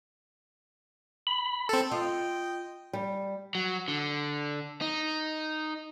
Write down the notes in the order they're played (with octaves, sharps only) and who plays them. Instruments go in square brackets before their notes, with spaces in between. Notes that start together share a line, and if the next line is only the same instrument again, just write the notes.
[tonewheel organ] B5
[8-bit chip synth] C4 A4
[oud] F4 [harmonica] D#5 G5
[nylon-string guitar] G3
[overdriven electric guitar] F#3
D3
D#4